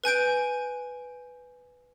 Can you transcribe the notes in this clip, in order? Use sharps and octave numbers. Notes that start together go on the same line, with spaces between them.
B4 G#5 G6 D7